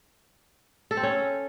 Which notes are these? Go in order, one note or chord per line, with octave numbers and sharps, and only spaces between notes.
A4
C4
C#4